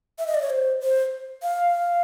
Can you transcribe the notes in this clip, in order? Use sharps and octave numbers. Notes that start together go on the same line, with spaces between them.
E5
D#5
D5
C#5
C5
C5
F5